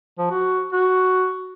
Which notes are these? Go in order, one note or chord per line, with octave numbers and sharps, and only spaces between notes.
F3
F#4
F#4